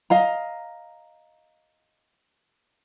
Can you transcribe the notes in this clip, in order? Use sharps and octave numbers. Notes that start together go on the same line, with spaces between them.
D#5 F5 A#5